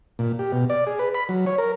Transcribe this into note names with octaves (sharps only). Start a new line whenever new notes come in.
A#2
G4
B2
D5
G#4
B4
B5
F#3
C#5
A#4